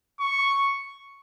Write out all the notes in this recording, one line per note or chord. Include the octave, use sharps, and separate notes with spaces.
C#6